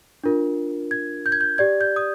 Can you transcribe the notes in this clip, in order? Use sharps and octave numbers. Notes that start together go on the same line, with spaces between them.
D4 F4 A#4
G#6
G6
G#6
G6
G4 D5 G#6
G6
D#6